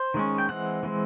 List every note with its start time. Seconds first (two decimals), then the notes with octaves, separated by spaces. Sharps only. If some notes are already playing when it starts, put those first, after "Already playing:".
Already playing: C5
0.14 D#3 G#3 C#4
0.38 G5
0.49 E3 G#3 C4 F#5
0.83 E3 G#3 C4